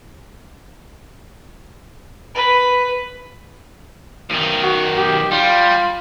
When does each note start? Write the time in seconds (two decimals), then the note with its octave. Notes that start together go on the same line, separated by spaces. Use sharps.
2.35 B4
4.30 B1 D#3
4.63 F#4
4.96 G4
5.31 G3 F4